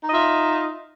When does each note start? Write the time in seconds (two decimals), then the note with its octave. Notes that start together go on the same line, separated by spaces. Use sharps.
0.04 D#4
0.08 D#5
0.11 F4
0.14 E5